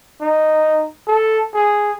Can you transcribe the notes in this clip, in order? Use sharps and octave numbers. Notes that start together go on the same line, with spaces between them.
D#4
A4
G#4